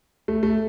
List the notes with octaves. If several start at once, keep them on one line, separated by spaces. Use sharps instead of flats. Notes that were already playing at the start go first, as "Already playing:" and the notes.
A3
A3